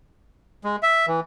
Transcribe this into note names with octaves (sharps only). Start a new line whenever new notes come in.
G#3
E5
E3